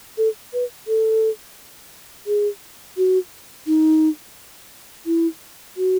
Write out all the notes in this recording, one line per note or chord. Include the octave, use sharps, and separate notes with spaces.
A4
B4
A4
G#4
F#4
D#4
E4
F#4